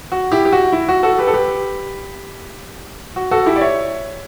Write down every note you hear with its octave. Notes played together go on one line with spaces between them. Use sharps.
F#4
E4 G4
G4
F#4
E4
F#4
F#4 A4
G4 B4
A4
G4 B4
F#4
F#4 A4
E4 G4
D5
C#5 E5